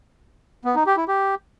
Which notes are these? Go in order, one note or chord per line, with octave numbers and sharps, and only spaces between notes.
B3
D#4
G4
E4
G4